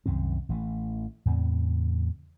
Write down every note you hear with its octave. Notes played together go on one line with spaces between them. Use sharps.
C2 F#2 D#3 C4
A1 E3 F#3 A3
E2 A2 C#3 C4